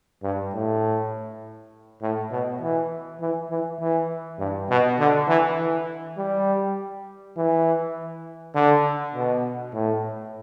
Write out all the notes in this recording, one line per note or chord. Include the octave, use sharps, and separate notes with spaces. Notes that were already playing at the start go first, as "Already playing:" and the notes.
G2
A2
A2
B2
E3
E3
E3
E3
G2
B2
D3
E3
E3
G3
E3
D3
B2
A2